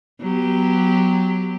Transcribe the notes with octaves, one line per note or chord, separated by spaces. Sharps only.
F#3 B3 G4